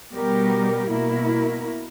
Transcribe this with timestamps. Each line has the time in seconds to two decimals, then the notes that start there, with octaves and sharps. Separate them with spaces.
0.12 B2 G3 B3 G4 A#4
0.88 B2 A#3 E4 A#4